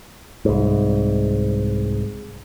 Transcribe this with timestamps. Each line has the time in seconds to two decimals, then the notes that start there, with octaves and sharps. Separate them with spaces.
0.45 C2 G#2